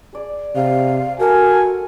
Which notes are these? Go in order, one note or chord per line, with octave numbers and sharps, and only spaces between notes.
G#4 D5
C3 F5
F#4 A4 A#4 F#5 G#5
A4 C6 C#6